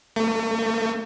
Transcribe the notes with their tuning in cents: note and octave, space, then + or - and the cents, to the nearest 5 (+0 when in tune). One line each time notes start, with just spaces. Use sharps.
A3 +40